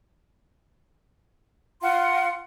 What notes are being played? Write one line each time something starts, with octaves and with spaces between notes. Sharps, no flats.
F4 F5 F#5 C6